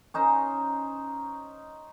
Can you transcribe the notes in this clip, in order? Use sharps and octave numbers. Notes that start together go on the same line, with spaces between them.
C#4 D#4 C5